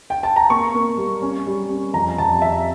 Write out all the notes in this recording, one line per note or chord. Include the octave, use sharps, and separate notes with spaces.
G5
A5
A#5
A#3 C#6
A#3
G3
C#4
G3
C#4
F2 A#5
F2 A5
F2 E5